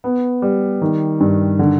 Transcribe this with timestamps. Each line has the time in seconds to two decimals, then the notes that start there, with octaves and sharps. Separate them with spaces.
0.04 B3
0.42 G3
0.82 D#3
1.20 G2
1.59 D3